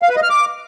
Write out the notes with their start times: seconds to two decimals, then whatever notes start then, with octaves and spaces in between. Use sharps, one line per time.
0.02 F5
0.09 B4
0.16 D#5
0.23 F6
0.30 D6